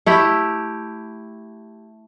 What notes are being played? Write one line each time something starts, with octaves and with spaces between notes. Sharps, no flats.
A3 E4 G4